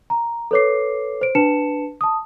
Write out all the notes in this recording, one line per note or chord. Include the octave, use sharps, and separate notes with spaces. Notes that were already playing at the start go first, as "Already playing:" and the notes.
A#5
A4 B4 C#5 D6 C7
C5 D7
D4 B4 A5 C#7 E7
A5 D#6